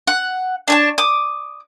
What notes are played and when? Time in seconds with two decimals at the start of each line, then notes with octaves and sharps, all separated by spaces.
0.07 F#5
0.68 D4 C#5 A5
0.98 D6 D#6